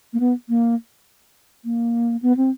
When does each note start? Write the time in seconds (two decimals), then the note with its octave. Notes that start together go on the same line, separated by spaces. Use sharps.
0.13 A#3
0.20 B3
0.49 A#3
1.65 A#3
2.22 B3
2.37 C4